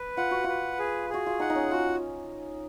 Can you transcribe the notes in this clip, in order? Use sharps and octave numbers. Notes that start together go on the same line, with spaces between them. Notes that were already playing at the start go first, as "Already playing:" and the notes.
Already playing: B4
F4 F#5
F#4
F4 B4
G#4
F#4 G#4
F4
D#4 F#5
D#4
C#4
F4 F#4